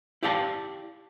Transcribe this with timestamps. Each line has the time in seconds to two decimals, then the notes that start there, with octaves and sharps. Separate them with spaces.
0.23 E4 G4 D5 F5 F#5 A5